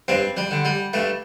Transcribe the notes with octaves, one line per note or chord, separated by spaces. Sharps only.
G2 C4
G3
D3
G3
G2 A3